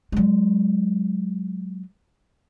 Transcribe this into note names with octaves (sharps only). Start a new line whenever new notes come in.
F#3 G#3